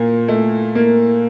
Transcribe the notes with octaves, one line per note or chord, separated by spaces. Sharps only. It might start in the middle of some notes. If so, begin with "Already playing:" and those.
Already playing: A#2 A#3
A3
A#3